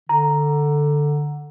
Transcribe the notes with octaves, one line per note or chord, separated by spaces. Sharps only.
D3 A#5